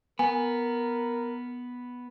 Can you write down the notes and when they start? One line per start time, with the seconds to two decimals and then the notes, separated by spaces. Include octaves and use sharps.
0.19 B3 A#4 G#5